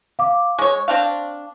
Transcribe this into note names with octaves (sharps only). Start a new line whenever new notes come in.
F5 D6
G#3 C#5 C#6
C4 D4 F5